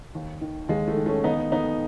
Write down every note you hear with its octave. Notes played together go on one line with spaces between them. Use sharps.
D#2
D#3
D#2 G#3
A3
D#3
A3 C#4
D#2 B3 D#4
D#3 B3 D#4